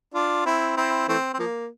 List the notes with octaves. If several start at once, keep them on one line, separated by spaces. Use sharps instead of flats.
D4 F4
C4 E4
C4 E4
E3 A3 C4
C4
F3 A#3